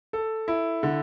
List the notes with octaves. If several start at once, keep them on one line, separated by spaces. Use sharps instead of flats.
A4
E4
D3